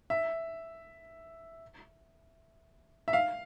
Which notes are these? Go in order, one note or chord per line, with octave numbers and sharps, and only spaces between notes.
E5
E5
F5